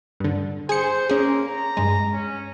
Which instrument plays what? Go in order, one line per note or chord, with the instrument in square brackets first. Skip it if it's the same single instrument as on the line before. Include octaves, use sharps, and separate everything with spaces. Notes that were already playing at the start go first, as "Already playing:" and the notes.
[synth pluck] G2 D3
[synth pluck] G#4 C#7 [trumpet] C5
[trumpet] A#3 [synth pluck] C#4 G#4
[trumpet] A#5
[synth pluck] G2 G#3
[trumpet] C#4